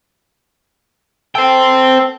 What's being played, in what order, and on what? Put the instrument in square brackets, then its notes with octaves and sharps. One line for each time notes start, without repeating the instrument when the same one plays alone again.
[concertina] A4 [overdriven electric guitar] C5 G5